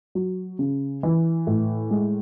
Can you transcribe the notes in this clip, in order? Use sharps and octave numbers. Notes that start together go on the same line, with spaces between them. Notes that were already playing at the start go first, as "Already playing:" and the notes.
F#3
C#3
E3
A2
G#3